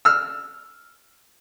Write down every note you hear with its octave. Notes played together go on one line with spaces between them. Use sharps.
E6 F6